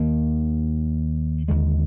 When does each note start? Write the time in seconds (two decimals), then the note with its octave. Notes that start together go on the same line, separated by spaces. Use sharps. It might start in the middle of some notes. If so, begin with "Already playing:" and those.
Already playing: D#2 D#3 A#3
1.48 D#2 D3 G#3